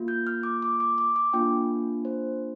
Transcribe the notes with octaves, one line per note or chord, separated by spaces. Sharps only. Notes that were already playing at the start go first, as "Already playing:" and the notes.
Already playing: A#3 F4
G6
F6
D6
D6
D6
D6
D6
A#3 D4 F4 G5
C5